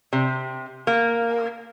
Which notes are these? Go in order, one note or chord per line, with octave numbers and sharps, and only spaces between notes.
C3
A#3